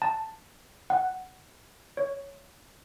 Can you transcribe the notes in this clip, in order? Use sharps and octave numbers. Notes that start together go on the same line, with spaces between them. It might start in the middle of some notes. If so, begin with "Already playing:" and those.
A5
F#5
C#5